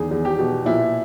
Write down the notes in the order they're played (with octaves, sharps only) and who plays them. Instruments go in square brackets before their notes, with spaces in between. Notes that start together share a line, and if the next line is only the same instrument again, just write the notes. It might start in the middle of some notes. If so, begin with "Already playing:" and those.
Already playing: [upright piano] E2 D#3 G#4
E2
G4
B2
A#2 E4